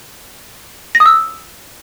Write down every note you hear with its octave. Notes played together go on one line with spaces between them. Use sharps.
A#6
D#6
E6